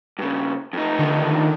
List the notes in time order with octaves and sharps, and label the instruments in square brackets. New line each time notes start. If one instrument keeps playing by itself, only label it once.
[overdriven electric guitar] G2 C#3
F2 D#4
[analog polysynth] D3 D#3